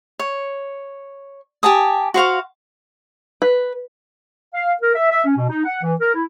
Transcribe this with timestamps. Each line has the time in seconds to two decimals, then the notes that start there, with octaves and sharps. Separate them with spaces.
0.19 C#5
1.63 G4 G#5 A5 D#6
2.14 F#4 C5 F5 C#6
3.42 B4
4.54 F5
4.81 A#4
4.95 E5
5.11 E5
5.25 C#4
5.36 B2
5.49 D#4
5.65 F#5
5.82 E3
6.00 A#4
6.15 E4